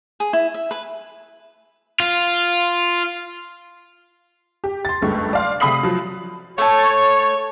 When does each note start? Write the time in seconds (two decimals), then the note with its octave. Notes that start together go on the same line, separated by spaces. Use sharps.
0.20 G#4
0.33 E4
0.54 E5
0.71 B4
2.00 F4
4.64 G4
4.85 C6 A6
5.02 F#1 C#2 G2 A3
5.33 D5 F5 C6
5.60 C3 A3 B5 D#6 C7 F#7
5.83 F3 F#3
6.58 A3 C#5 A5